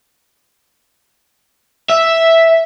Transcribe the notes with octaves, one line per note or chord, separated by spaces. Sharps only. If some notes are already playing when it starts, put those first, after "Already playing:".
E5